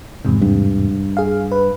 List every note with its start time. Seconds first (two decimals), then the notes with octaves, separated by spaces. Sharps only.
0.25 E2 G#2 C3
0.42 G2
1.17 G#4 F5
1.52 B4